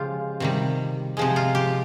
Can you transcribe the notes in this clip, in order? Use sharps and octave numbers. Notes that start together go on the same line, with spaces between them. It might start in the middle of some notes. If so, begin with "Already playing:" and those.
Already playing: C#3 F3 G#3 F4 G4
C3 D#3 G3
C3 F3 G#3
F4
G4